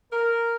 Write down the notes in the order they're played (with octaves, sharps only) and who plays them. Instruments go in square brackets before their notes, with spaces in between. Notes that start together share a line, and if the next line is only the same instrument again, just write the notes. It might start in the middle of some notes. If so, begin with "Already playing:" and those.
[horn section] A#4